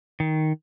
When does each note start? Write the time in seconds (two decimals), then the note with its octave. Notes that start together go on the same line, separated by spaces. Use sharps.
0.20 D#3